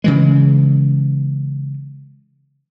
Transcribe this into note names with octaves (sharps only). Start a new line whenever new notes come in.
C#3 E3 G#3